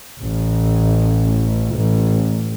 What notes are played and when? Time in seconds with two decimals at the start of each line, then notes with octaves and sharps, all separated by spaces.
0.21 A1
1.73 A1